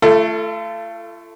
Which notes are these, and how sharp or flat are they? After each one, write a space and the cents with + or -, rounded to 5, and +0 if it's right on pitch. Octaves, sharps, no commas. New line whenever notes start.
A3 +0 F4 -40 A4 +10